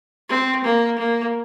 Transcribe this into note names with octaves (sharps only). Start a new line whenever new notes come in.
C4
A#3
A#3